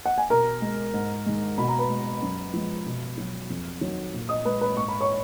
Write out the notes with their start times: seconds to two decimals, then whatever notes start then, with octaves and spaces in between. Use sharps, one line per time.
0.05 F#5
0.18 G#5
0.30 B2 A#4 A#5
0.62 G#3
0.94 G#2
1.26 D#3 G#3
1.58 B2 B5
1.68 A#5
1.79 B4 B5
1.90 G#3
2.22 F#2
2.53 F3 G#3
2.86 B2
3.18 F#3
3.50 F2
3.81 D#3 F#3
4.14 A#2
4.29 D#5 D#6
4.45 G#3 B4 B5
4.61 B4 B5
4.77 G#2 C#6
4.88 B5
5.01 C#5 C#6